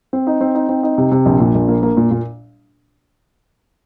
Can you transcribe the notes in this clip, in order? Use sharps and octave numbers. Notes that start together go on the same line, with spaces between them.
C4
D#4
C4
D#4
C4
D#4
C3
C3
A#1
A#2
A#1
A#3
A#3
A#2
A#2